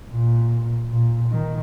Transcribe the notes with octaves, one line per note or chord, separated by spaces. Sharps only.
A#2
A#2
D#3